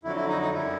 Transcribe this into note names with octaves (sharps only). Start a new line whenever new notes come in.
F2 D3 F#3 E4
E4
D#4
D#4
F#2 D3 G3 E4